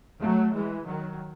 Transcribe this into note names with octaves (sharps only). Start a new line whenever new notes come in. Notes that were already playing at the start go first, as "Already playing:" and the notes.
F#3 A3
E3 G#3
D#3 F#3